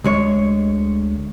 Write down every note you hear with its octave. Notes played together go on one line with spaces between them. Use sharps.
D2 G#3 C#5